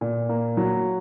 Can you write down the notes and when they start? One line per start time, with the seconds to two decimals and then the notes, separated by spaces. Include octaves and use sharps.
0.01 A#2
0.29 A#3
0.57 F#3